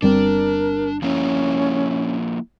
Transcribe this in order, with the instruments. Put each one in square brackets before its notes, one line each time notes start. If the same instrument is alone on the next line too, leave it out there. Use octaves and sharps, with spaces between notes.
[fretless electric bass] G1 G3 C4 [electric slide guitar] D4 [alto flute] A#4
[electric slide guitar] F3 A#3 E4 [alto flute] C#4